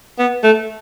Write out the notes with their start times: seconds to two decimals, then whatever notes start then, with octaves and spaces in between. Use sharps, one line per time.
0.19 B3
0.43 A3